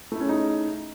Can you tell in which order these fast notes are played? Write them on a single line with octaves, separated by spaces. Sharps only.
A3 E4 C#4 G#4 D#4